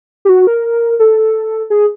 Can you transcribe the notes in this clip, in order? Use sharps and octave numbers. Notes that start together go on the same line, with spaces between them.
G4
F#4
A#4
A4
G#4